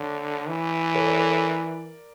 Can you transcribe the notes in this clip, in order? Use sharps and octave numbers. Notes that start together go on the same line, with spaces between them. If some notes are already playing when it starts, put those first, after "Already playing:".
Already playing: D3 C#5
E3
A4 C#5
A#4 D5
A4 C#5
A#4 D5